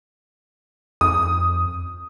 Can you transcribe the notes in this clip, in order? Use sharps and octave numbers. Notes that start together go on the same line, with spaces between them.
F2 D#6